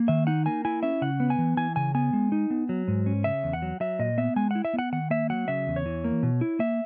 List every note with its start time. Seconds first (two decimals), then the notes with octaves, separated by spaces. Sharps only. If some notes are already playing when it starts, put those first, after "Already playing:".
Already playing: A#3
0.08 D#3 E5
0.27 D#4 F#5
0.46 A#3 G#5
0.65 E4 G#5
0.83 C#4 E5
1.02 C#3 F#5
1.20 B3
1.30 G#5
1.38 E3
1.57 E3 G#5
1.76 C#3 G#5
1.95 B3 G#5
2.13 G#3
2.32 D#4
2.50 B3
2.69 F#3
2.88 G#2
3.06 C#4
3.24 C#3 E5
3.44 E2
3.53 F#5
3.62 F#3
3.80 F#3 E5
3.99 A#2 D#5
4.18 B3 E5
4.36 G#3 G#5
4.51 E4 F#5
4.65 E5
4.74 B3 F#5
4.92 D#3 F#5
5.10 A#3 E5
5.30 F#3 F#5
5.48 C#3 E5
5.67 E2
5.76 C#5
5.86 E3
6.04 A#3
6.23 B2
6.41 E4
6.59 A#3 E5